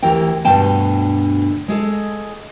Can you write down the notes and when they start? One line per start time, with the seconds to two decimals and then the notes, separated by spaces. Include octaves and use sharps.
0.02 D2 E3 G4 A#4 G5
0.45 D2 G2 B2 D3 G5 A5
1.68 G#3 G#4 A4